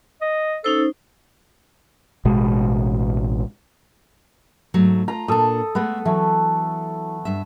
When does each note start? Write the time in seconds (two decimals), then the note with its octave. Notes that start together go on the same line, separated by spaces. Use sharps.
0.22 D#5
0.64 C#4 D#4 A4 C5
2.25 A1 B2 G#3
4.74 G#2 F#3 A3
5.08 F4 A#5
5.28 A#2 D4 A4 D#6
5.75 G#3 A3 B3
6.05 E3 F#3 A3
7.25 G2 E5